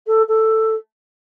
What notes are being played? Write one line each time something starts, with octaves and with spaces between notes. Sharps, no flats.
A4
A4